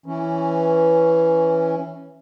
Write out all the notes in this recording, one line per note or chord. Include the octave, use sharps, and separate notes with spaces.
E3 C#4